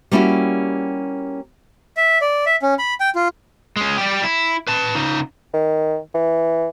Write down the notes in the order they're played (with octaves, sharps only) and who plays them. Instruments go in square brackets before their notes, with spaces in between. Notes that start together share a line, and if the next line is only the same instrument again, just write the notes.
[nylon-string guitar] G3 A#3 C#4 E4 F#4 G4
[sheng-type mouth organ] E5
D5
E5
C#4
B5
G5
F4
[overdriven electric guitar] G#3 C#4
G3 G4
E4
B4 A5
C#3 D#4
[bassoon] D#3
E3